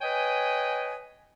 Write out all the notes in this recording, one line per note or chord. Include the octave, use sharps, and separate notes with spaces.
B4 C#5 D#5 G5 G#5